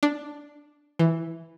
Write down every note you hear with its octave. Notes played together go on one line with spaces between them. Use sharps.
D4
E3